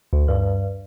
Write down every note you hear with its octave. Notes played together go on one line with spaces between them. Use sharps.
D2
G2